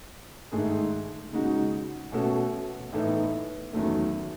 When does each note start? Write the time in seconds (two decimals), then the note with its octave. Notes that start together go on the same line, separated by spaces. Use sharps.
0.52 G#2 D#3 A3 D#4 G#4
1.32 C#3 G#3 D#4 F#4
2.12 B2 A3 C#4 F#4 A4
2.93 A2 E3 B3 D#4 A4
3.73 E2 D#3 F#3 A3 C#4